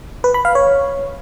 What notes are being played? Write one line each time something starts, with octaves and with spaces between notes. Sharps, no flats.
B4
B5
F5
C#5